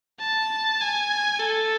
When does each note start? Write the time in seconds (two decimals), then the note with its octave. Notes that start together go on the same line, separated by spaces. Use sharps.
0.21 A5
0.80 G#5
1.40 A4